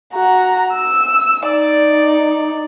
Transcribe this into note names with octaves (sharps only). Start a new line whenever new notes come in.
F#4 A#5
E6
D#4 D5